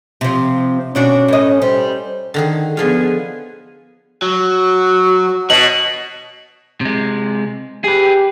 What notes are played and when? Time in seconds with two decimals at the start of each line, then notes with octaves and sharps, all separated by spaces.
0.21 C3 F3
0.95 B2 C#4 D4 F#4
1.28 A2 D#5
1.62 G3 C5
2.34 D3 D#3 G#4
2.77 D3 F3 B3 F4 G#4
4.22 F#3 F#4
5.50 B2 C#5 F#7
6.81 C3 G#3
7.84 G4 G#4 B4